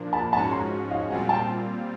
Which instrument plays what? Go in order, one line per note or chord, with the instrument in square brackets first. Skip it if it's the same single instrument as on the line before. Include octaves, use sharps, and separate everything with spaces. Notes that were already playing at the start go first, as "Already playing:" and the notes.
Already playing: [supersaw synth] A#2 F3 A#3 D4
[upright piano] A5 B5
[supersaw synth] G#2 F3 G#3 C#4 F#4 [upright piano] A5 B5
[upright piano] A#5 C6
D#5 F5
[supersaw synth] A#2 G3 C4 F4 [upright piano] F#5 G#5
[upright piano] G5 A5